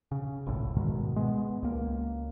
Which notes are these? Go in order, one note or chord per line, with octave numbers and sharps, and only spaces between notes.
C#3
G#1 C#2 A2
G#2 B2 D#3 G#3
G#3 B3
C#2 A#3